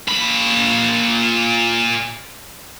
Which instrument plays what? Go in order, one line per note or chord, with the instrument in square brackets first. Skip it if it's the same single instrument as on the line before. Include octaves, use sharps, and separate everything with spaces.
[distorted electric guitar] A#2 B5